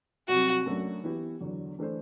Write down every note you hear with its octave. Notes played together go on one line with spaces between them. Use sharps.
C2 C3 F#3 F#4
F#2 F#3 A3 D4
E3 B3 E4 G4
E2 D3 F#3
E3 A3 D4 A4 C5